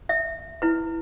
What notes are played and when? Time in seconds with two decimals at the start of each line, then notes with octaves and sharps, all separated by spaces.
0.09 E5
0.62 E4 B4